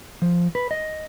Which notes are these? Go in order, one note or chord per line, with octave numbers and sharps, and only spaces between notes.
F3
B4
D#5